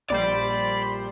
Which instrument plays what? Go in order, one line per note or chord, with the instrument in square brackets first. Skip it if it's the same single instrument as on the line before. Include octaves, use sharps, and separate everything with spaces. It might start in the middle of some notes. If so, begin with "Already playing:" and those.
[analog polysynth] A#1 G3 C5 [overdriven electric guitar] D5 [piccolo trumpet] B5